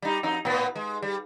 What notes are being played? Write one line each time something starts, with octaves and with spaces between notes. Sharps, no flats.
G3 D#4
F2 D#4
A2 B3
G#3
G3